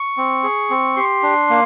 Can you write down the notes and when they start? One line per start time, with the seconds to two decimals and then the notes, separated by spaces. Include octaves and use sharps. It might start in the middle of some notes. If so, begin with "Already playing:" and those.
Already playing: C#6
0.17 C4
0.43 G#4
0.70 C4
0.96 G4 C6
1.23 D4
1.50 A#3